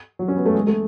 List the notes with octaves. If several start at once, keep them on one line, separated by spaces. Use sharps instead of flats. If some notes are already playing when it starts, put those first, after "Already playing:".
F#3
C#4
B3
A3
G#3
A3